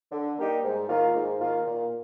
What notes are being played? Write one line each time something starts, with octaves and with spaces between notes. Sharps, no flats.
D3
G3 A#3 D#4 G4
G#2
D#3 A#3 F4
G#2
D#3 A#3 F4
A#2